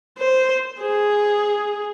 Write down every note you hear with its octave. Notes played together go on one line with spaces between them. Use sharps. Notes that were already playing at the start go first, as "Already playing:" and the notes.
C5
G#4